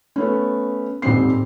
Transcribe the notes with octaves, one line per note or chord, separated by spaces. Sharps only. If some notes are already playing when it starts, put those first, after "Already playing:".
A3 B3 C#4
D#1 G#2 G3 C4 C7